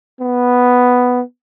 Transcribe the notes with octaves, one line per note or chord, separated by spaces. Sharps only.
B3